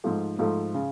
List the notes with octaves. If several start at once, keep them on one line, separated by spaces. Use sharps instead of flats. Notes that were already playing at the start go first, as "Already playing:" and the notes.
G#2 F3 A3
G#2 F3 A3
C#3